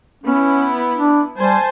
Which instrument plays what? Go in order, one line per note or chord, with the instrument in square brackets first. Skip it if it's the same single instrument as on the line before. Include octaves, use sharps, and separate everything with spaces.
[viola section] B3 E4 [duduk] C#4
[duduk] D4
[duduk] G3 [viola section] C5 G#5 A5